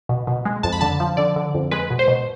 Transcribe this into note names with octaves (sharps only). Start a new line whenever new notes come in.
B2
B2
G#3
F2 A5
B5
D3 A5
F3
D3 D5
D3
F2
G#3 B4
B2
C5
B2